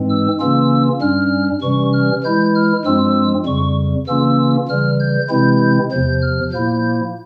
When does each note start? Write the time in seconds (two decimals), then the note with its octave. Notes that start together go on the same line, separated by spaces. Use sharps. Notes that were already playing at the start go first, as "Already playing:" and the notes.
Already playing: G#2 E3 G#3 C4
0.09 E6
0.40 C#3 E3 A#3 C#4 F4 E6
1.01 G2 G3 C#4 F6
1.62 C3 E3 G3 C#4 C#6
1.92 F6
2.23 E3 G#3 E4 G6
2.55 F6
2.85 G2 F3 G#3 C4 F4 E6
3.46 F2 C#3 G3 C#6
4.07 C#3 E3 A#3 C#4 F4 E6
4.68 C#3 E3 G3 F6
4.99 G6
5.29 C3 E3 G#3 C4 E4 G6
5.91 E2 C3 F3 G6
6.22 F6
6.52 A#2 F3 A#3 E4 G6